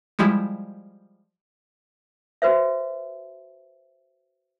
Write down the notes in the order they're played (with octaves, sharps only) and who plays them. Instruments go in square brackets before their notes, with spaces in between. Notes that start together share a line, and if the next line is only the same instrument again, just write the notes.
[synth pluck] F3 G3 G#3 E4
[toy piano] F#4 B4 C5 E5